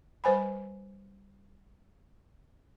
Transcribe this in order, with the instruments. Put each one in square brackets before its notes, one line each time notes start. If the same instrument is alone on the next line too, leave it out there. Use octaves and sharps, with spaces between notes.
[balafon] G3 B4 C5 G#5 B5